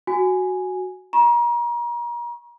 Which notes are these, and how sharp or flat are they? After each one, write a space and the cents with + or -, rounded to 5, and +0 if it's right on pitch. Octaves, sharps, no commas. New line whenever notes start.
F#4 +0 G#5 +0
A#5 +35 C#6 -30